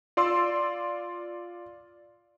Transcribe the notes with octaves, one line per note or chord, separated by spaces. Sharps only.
F4 D5 C6 E6